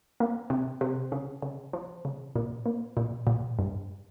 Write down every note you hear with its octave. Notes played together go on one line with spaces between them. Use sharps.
A#3
C3
C3
C#3
C#3
F3
C#3
A#2
A#3
A#2
A#2
G2